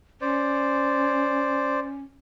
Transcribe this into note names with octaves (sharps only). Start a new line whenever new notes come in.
C#4 C5 D5